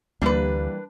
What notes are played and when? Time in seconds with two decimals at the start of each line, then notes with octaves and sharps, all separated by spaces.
0.22 D2 E3 G3 A#3 D4 B4